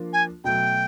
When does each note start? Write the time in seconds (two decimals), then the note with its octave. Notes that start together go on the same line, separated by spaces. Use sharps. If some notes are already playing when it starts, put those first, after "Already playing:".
Already playing: F3 A#3 D4 F4
0.13 G#5
0.44 B2 F#3 A3 G5